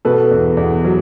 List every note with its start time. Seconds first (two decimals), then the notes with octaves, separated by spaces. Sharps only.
0.05 B2 A4 B4
0.31 E2
0.57 E2
0.85 F#3